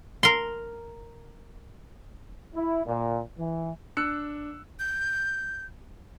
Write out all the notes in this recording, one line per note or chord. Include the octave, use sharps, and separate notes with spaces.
A#4 C6
E4
A#2
E3
D4 E6 F#6 C#7
G6